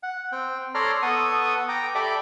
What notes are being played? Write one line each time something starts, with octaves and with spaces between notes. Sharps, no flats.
F#5
C4 G5
A4 C#5 D5 A#5 C6 F6
B3 A4 C#6 D#6
G5 A#5 D6
G4 A4 D5 E5 B5 D6